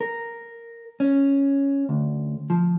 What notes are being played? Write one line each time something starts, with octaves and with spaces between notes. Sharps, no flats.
A#4
C#4
D2
F3